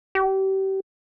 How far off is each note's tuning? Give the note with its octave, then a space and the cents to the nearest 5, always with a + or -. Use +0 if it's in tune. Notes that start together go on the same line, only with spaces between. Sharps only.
G4 -30